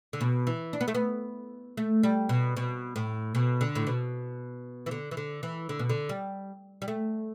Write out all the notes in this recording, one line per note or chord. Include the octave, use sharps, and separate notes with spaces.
D3
B2
E3
D4
B3
A3
B3
A3
G3
B2
B2
A2
B2
D3
A2
B2
E3
D3
E3
D3
E3
D3
B2
D3
G3
G3
A3